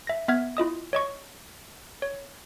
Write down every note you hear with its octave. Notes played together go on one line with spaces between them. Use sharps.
E5 A#6
B3 E5 F6 G#6
E4 F4 D#5 D#6
C#5 D#5 C#6
C#5